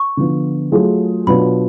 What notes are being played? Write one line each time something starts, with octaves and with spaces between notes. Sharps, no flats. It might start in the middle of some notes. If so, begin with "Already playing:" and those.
Already playing: C#6
D3 F3 B3 F4
F#3 A3 F4 G#4
B2 F#3 B3 D4 F4 B5